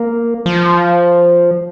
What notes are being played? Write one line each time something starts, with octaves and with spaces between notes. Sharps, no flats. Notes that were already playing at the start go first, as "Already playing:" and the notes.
Already playing: A#3
F3